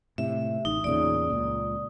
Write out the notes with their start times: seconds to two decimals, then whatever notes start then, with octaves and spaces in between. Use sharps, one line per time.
0.18 A2 C3 E5
0.65 A1 D#4
0.84 E2 A#2 C#3 D5 D#6
1.30 C#2 A#2